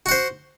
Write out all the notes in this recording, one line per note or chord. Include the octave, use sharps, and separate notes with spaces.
F#4 C5 F#5